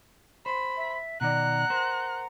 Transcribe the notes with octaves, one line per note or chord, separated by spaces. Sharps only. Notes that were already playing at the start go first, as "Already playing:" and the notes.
C5 B5
E5
B2 D#3 D5 F#5 A#5 F#6
A#4 C5